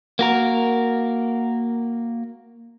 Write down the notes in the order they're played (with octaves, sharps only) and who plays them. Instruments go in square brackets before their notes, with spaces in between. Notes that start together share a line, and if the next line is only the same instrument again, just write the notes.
[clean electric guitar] A#3 F#4 A#4